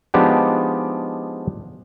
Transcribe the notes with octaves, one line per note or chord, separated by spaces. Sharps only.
F3 G#3 B3 D4 D#4 G4